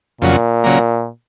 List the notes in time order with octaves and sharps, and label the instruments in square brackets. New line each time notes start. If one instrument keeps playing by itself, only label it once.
[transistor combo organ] F2 C#3 F#3 [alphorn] A#2
[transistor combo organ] C#3 F#3 A#3